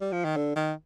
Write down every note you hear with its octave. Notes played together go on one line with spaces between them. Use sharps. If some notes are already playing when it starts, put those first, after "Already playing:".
G3
F3
D#3
D3
D#3